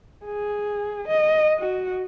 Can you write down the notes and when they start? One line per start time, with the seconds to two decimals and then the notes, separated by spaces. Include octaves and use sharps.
0.25 G#4
1.09 D#5
1.58 F#4